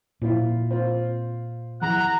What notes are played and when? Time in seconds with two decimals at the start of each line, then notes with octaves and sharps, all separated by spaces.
0.22 A#2 F3 E4 F4
0.71 C4 F4
1.82 E2 F#5 A#5